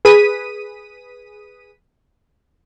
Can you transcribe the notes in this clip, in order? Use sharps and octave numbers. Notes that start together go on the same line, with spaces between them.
G#4 B4 D#6 B6 D#7